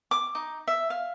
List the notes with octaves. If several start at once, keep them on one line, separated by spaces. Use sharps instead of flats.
D6
D#4
E5
F5